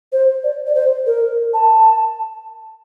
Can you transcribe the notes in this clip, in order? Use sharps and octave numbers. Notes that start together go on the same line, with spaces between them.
C5
D5
D5
C5
A#4
A5